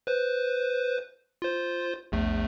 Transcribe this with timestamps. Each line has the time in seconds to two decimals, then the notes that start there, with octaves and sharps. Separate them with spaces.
0.07 B4 C5
1.42 F4 C5
2.12 A#1 E2 A3